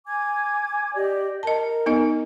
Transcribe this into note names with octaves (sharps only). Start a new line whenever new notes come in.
G#5 D6 G#6
G4 D5 D#5
A#4 D#5 A5
B3 D#4 D#5